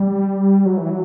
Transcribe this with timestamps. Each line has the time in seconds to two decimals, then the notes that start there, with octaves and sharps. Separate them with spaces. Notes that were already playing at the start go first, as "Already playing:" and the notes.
Already playing: G3
0.66 F#3
0.77 E3
0.90 F#3